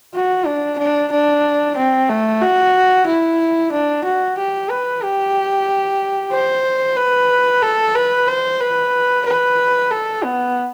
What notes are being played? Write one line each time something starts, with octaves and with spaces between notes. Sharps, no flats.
F#4
D4
D4
D4
C4
A3
F#4
E4
D4
F#4
G4
B4
G4
C5
B4
A4
B4
C5
B4
B4
A4
B3